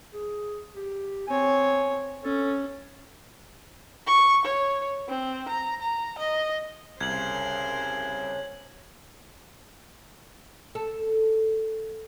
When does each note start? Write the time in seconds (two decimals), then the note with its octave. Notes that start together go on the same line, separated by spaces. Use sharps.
0.13 G#4
0.75 G4
1.28 C4 C#5 G#5
2.23 C#4 A4
4.07 C#6
4.45 C#5
5.08 C4
5.49 A#5
5.81 A#5
6.18 D#5
7.01 C2 C#3 A#4 C5 G#6 F#7
10.75 A4